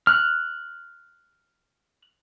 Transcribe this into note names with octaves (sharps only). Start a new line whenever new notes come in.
F6 F#6